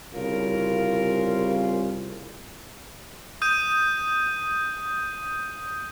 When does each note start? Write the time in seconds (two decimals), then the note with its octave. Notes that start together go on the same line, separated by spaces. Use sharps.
0.13 C2 C#3 C#4 F4 A#4
3.42 D#6 G6 D#7